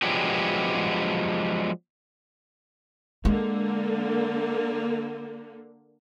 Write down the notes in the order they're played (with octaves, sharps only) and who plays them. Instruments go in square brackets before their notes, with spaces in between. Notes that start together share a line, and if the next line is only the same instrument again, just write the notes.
[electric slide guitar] F3 F#3 G#3 B3 D4 G4
[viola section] D3 A#3 [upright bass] G#3